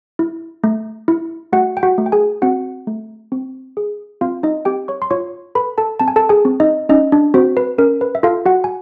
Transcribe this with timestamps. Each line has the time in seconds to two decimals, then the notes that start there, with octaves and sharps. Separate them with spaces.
0.19 E4
0.64 A3
1.08 E4
1.52 A3 F#4 F#5
1.77 G5
1.83 F#4 F#5
1.98 A3
2.06 G5
2.12 G#4 G#5
2.42 C4 F#4 F#5
2.87 A3
3.32 C4
3.77 G#4
4.21 C4 F4 F5
4.43 D#4 D#5
4.65 C4 G4 G5
4.88 C#5 C#6
5.02 C6
5.11 F4 C#5 C#6
5.55 A4 B4 B5
5.78 A4 A5
6.00 C4 A5
6.08 G#5
6.16 A4 A5
6.29 G#4 G#5
6.45 C4
6.60 D#4 D#5
6.89 C#4 D#4 D#5
7.12 D4 D5
7.34 C4 F#4 C5
7.57 B4
7.78 C#4 A#4
8.01 B4
8.15 E5
8.23 F4 A4 F5
8.46 F#4 F#5
8.64 G#5